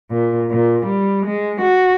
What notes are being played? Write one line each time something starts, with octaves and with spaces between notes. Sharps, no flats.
A#2
A#2
G3
G#3
F#4